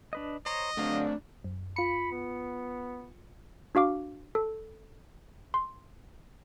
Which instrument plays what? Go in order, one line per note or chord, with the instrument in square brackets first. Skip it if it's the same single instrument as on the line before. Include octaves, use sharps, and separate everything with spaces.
[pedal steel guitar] D4 B4 D#5
[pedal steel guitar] C5 C#5 A#5 [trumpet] D#5
[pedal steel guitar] D3 F#3 F5 [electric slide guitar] A3 C4 [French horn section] D4
[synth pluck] F#2
[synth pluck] F4 C#7 [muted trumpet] B5
[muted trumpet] B3
[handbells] D4 F#4 F5 D6
A4
C6